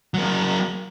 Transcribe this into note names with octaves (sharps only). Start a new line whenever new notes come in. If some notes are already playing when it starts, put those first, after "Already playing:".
F#3 A#3